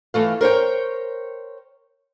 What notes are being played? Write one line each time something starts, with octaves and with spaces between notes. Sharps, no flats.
E3 A3 F5
A#4 C5 C#5 G5